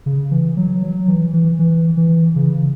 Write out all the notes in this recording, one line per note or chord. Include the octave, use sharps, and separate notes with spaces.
C#3
E3
F#3
F#3
E3
E3
E3
E3
C#3